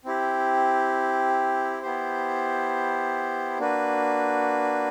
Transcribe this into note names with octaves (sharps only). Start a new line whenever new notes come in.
C4 E4 G4
B3 E4 G4 C5
A#3 D4 F#4 B4